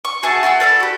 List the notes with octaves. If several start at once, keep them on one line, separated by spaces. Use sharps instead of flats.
C#6
F#4 G#4 E5 A5
F#4 G#4 G5 E6
E4 A4 A#4 D5
F#4 G4